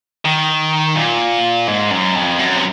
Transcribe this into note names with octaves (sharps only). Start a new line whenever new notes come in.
D#3
A#2
G#2
F#2
F2
F#2
C3